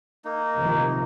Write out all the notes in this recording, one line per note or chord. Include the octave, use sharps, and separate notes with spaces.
A#3 D#4
C3 D#3 F3